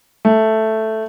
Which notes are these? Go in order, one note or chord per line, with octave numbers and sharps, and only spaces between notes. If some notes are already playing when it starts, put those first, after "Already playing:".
A3